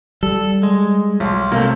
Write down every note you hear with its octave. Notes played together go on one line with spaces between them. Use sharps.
G3 A4
G#3
B1 C6
C3 A3 A#3